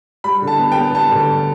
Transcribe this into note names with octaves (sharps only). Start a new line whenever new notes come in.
G3 B5
D3
A5
B3
G5
B3
G3 A5
D2